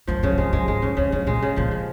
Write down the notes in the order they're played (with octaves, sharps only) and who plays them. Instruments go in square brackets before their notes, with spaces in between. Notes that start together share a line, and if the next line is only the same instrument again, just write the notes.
[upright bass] F#2 [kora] F3
[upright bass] F#2 [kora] C#3
[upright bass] F2 [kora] G#3
[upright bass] F#2 [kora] G#3
[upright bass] G#2 [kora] G#3
[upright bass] F#2 [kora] C#3
[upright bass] F2 [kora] C#3
[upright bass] F#2 [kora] C#3
[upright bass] A#2 [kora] G#3
[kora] C#3
[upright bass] A#2 [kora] F3
[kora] C#3